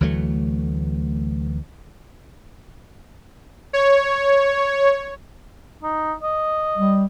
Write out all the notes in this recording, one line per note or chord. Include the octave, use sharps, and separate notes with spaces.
D2 E3 F#3 A3
C#5
D#4
D#5
G3